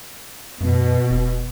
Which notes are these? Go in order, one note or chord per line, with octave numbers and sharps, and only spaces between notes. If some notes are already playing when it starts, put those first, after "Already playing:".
F#2 B2
E1